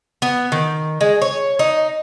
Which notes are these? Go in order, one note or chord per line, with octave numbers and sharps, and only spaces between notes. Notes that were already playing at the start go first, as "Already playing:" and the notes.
B3
D#3
G#3
C#5
D#4